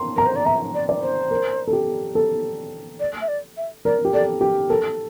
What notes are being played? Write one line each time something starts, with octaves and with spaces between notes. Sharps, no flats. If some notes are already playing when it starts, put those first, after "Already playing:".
Already playing: C6
A#4 A#5
C5
D5
E5 A#5
D5
D5
C5
A#4
A4
G4
A4
D5
E5
D5
E5
A#4 D5
G4
A4 D5
G4
A4 A#4